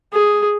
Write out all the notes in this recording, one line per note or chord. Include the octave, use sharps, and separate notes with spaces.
G#4